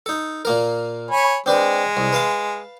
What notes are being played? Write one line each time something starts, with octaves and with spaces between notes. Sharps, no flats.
D#4 A4
A#2 A#3 A#4
C#5 G#5 B5
G#3 C4 D4 B4
C2
B4 F5 A5